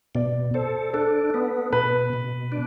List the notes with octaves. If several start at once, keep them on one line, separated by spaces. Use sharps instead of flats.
B2 D5
A4 C5
D4 A4
B3
B2 B4
B2
D4